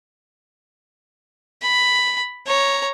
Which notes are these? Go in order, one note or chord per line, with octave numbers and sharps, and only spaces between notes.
B5
C#5 A#5